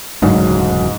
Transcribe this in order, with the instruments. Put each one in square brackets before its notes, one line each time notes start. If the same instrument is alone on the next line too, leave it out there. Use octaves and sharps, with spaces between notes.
[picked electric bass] E1 D2 C#3 [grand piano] G#2 [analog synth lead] F#3